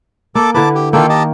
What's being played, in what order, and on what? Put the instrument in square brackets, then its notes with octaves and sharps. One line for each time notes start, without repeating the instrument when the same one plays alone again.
[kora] A#3 [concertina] A4 A5 D6
[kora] D3 E4 B4 [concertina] A5 D6
[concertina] G4
[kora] D#3 A#3 [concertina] F4 A4 G5
[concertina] G4 D#5 A5